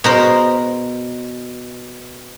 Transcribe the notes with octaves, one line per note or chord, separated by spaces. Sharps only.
B2 A#4 C5